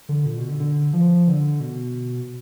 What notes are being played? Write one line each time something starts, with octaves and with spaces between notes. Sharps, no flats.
D3
A#2
B2
D3
D3
F3
D3
B2